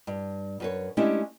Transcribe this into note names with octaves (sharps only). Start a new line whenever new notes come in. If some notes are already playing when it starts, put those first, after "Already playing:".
G2
F#2 B4 C#5
G#3 A3 C#4 D4 E4 G4